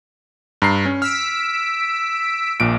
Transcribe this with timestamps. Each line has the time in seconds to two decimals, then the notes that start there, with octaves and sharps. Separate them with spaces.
0.62 G2 A#5 C7
0.86 C#4
1.02 E6 F6 B6 D7
2.60 A#1 A#2 D7